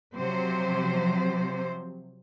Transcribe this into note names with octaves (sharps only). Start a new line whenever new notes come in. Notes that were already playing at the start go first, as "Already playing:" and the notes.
C3 F3 F#3 C5